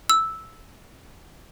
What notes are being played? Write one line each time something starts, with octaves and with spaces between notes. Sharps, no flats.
E6